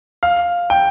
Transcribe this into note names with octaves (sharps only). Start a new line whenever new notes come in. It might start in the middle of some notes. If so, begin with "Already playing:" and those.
F5
G5